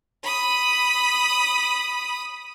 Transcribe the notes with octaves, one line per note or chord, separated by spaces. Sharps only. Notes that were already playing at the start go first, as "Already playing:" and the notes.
B5 D#6